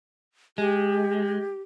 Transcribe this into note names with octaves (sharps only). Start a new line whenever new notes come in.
G#3 G4